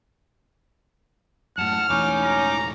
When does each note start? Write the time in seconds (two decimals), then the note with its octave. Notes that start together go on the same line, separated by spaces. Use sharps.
1.58 F#2 A2 F#5 A5 F6
1.90 E1 A1 A2 C#4 D#4 D6
2.24 A#5